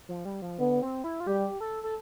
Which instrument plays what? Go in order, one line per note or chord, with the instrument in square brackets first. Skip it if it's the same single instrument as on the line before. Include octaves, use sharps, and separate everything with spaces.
[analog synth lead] F3
G3
F3
[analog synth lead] D3 [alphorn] B3
[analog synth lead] C4
E4
F4
[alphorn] G3 [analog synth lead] G4
[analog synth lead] A4
A4